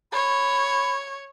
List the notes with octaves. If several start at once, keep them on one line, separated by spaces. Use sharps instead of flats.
C#5 B5